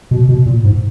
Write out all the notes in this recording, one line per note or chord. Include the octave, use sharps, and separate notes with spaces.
B2
B2
A#2
G#2